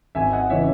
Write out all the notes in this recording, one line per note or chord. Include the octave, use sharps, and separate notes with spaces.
G#1 E5 G#5
D#5 F#5
C#3 E3 C#5 E5